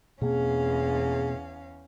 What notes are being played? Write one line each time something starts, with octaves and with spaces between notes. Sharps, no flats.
E2 B2 A#3 C4 C#4 G#4 F5